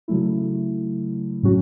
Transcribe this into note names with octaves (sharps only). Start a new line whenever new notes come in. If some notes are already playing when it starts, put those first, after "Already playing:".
C#3 F#3 A3 E4
A2 F#3 C#4 F#4